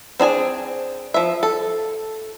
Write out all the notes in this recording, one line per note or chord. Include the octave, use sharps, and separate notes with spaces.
C4 D4 G#4 G#5
F3 E5
A4